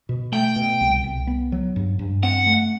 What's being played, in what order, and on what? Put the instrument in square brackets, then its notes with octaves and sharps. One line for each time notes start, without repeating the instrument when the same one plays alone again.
[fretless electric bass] B2
[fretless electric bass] A3 [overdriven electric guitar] G5
[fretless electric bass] B2
C2
C2
B3
F#3
G2
G2
[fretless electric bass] C4 [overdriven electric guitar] F#5
[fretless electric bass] A3